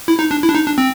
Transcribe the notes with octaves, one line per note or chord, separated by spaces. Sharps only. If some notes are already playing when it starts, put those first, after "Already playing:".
E4
D#4
D4
E4
D4
D#4
D4
C4